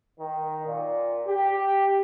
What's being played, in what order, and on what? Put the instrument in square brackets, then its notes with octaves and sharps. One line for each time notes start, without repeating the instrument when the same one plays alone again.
[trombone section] D#3
A#2
G4